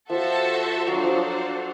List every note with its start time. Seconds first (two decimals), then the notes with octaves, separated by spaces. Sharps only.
0.10 F3 F#4 A4 C5 E5 A5
0.87 F#3 D4 F#4 A4 C5 F5
1.04 F3 F#3